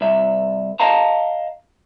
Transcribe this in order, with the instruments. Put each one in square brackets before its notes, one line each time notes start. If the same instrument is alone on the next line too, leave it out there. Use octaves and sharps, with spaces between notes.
[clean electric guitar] C2 E5
D#5 F5 A5 A#5